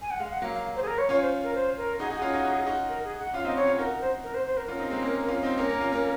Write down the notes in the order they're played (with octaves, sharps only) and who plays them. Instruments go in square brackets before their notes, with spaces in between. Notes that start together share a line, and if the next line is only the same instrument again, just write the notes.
[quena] G#5
F#5
[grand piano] G#3 [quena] F5
[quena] F#5
[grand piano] F#3 A#3 [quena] F5
[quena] F5
C5
G#4
A#4
C#5
[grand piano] C#4 F4 [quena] C#5
[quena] C5
A#4
C5
A#4
[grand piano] D#4 F#4 [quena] G#4
[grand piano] D#4 F#4 [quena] G#4
[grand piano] C#4 F4
D#4 F#4
D#4 F#4
D#4 F#4
[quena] A#4
G#4
F#5
[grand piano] C#4 F4 [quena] F5
[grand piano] C4 D#4 [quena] D#5
[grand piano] C#4 F4 [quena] C#5
[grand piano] C#4 F4
[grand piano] D#4 F#4 [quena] A#4
[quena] A#4
C5
A#4
C5
C5
A#4
[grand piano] C#4 F4 [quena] A#4
[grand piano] C4 D#4
G#3 C4
A#3 C#4
C#4 F4
C4 D#4
[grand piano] A#3 C#4 [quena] A#4
[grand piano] A#3 C#4
C#4 F4
A#3 C#4